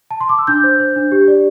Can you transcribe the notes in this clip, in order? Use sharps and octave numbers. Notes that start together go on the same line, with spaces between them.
A5
C6
D6
E6
D4 G6
C5
C5
D4
G4
D5